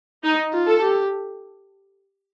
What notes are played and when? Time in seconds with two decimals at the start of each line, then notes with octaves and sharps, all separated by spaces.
0.24 D#4
0.53 F4
0.68 A4
0.83 G4